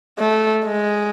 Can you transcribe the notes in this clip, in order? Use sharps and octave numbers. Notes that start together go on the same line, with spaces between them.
A3
G#3